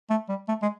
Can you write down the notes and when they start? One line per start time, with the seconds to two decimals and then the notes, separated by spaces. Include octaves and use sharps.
0.10 A3
0.29 G3
0.48 A3
0.62 G#3